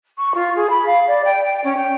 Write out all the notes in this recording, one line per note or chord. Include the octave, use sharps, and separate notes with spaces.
C#6
F4
G#4
B5
F5
D5
G5
G5
C#4
G5